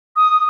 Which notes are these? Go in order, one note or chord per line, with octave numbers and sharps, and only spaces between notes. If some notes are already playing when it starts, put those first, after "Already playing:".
D#6